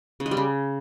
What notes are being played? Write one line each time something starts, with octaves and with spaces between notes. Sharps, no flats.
C#3
G#3
G3
C#3